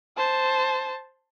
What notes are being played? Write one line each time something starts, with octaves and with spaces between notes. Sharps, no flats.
C5 A5